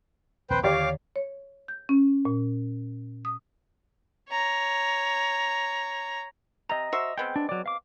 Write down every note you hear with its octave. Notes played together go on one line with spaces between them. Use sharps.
A#1 D#2 C4 B4 C5 G5
D#2 D3 D#3 G4 C#5 D5 F5 D6
C#5
G6
C#4
A#2
D#6
C#5 A#5
C3 D#5 A#5
F#4 C5 E5
G#3 B3 C4 G5
D4
F#3 D5
F5 D6